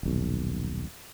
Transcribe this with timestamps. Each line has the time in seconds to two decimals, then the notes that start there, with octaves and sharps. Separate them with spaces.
0.03 D#1 B1